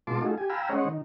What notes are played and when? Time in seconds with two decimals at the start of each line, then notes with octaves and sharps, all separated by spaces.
0.07 B2 G#3 F4 A5 C6 D6
0.21 A3 D#4 F4 F#4 G#4 A4
0.38 G4 G#5
0.50 F5 G5 G#5 A#5 B5 E6
0.69 G#3 C#4 C5 C#5 D#5 F#5
0.85 D#3